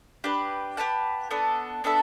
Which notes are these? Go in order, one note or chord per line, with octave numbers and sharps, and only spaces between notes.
D4 G4 B4
G4 B4 F#5 A5
B3 D4 A4
B3 D4 A4 E5